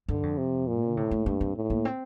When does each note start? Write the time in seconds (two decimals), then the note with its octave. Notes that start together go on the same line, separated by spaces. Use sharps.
0.09 G2 D3
0.23 F2
0.38 C3
0.67 A#2
0.85 D3
0.97 A2 C3
1.11 A3
1.26 G2 A3
1.41 C4
1.56 A2
1.70 A#3
1.85 C4